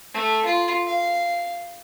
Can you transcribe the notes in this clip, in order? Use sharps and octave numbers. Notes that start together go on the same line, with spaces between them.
A3
F4
F5